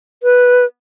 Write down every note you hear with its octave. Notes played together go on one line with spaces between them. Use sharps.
B4